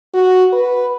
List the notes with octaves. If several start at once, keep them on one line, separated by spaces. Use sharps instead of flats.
F#4
B4